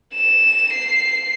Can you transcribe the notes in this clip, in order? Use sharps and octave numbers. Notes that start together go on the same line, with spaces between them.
E7
C7